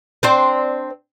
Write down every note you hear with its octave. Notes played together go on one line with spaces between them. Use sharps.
C4 D4 C5